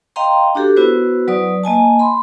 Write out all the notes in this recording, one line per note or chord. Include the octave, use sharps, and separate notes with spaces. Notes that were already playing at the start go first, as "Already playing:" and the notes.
D#5 F5 G5 A#5 C6
D4 F#4 G4 A4
B3 E4 F#4 B4 C5
F#3 B4 D5 D#6
A#3 D#5 G#5 A5
B5 C6